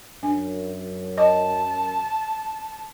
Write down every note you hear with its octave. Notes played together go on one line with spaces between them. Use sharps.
F#2 D4
D#5 A5